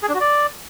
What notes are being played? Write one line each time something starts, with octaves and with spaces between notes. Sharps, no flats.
G#4
D4
F#4
D5